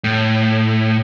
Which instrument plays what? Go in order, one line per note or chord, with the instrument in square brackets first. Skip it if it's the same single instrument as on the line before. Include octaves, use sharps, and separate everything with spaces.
[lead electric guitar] A2